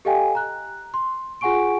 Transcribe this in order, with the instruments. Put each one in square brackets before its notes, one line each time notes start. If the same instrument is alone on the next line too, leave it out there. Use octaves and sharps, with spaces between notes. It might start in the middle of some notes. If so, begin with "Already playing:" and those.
[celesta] G4 A4 D#5 F5 G5 G#5
A#5 F#6
C6
F4 G#4 F#5 G#5 C#6 D7